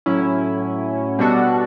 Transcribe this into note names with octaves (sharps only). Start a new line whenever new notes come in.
A2 F#3 C#4 E4
B2 G3 D4 F#4 A4